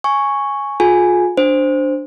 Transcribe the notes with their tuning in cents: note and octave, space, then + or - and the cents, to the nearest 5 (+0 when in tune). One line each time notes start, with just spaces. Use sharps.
G#5 +0 C#6 +0
F4 +35 G#4 +35 G#5 +0
D4 +0 C5 +0